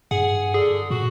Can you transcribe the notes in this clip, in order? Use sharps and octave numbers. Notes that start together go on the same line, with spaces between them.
G2 G#4 F#5
D3 G#4
A#2 F#4